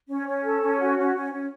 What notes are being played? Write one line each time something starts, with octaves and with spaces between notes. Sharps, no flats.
C#4
C#4
A4
C#4
F#4
C#4
C#4
C#4